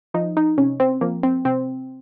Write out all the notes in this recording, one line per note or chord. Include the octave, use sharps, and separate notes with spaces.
F3 D#4
D#4
C3 C#4
C4
F3 A#3
C4
C3 C4